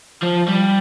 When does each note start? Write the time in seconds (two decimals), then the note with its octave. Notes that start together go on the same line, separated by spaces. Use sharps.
0.22 F3
0.48 G3